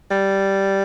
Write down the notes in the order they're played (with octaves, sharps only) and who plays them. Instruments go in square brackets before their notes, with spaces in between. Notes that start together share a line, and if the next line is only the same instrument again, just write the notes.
[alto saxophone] G3